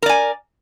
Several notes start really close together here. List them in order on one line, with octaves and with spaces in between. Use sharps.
A#4 D5 G#5